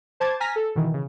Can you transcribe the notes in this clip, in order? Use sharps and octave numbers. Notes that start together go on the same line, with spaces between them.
C5 A5 D6 G#6 A6
G#5 A#5 F6 A#6 B6
A4
B2 D#3 E3
C#3